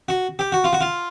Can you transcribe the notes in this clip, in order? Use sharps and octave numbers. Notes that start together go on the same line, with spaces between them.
F#4
G4
F#4
F4
F#4
F4